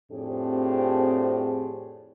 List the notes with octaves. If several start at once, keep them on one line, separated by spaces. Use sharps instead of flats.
F2 A2 C4 D4 G4 G#4